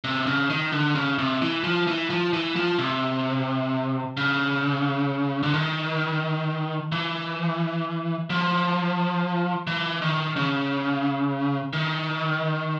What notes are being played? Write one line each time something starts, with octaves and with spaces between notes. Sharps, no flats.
C3
C#3
D#3
D3
C#3
C3
E3
F3
E3
F3
E3
F3
C3
C#3
D3
D#3
E3
F3
E3
D#3
C#3
D#3